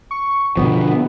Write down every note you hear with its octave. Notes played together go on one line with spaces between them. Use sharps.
C#6
B2 D3 F3 B3